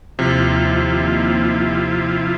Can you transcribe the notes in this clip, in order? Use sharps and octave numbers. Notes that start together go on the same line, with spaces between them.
D#2 C3 F3 E4 F4